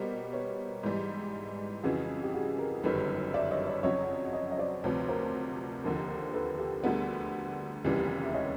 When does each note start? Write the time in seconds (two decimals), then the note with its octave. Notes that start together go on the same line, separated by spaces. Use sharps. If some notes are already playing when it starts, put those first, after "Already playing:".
Already playing: B2 G3 A#3 A#4 C5
0.33 B4 C#5
0.83 G#2 E3 G3
1.83 F2 C#3 E3 F#4 G#4
2.23 G4
2.34 F#4 G#4
2.58 G#4 A#4
2.83 G1 F#2 D#3 G3 A4 B4
3.34 D5 E5
3.51 C#5 D#5
3.66 C#5 D#5
3.83 F2 C#3 F#3 C#5 D#5
4.33 C#5 D#5
4.51 D#5
4.58 C5 D5
4.83 D2 C3 F3 B4 C#5
5.09 A#4 C5
5.84 D#2 D3 F3 A#3
6.33 A4 B4
6.59 G4 A4
6.83 D2 D3 G3 B3 G#4 A#4
7.84 F1 D#2 C#3 E3 G3
8.24 E5
8.34 C#5 D#5